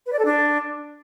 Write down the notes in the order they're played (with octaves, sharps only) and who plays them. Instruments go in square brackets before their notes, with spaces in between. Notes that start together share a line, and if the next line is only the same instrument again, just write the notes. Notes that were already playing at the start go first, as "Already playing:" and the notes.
[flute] B4
D5
A4
D4